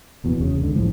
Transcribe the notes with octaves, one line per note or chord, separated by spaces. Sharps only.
F1 E2 B2
E1 C#3
C#2 D3
A1 A2 F3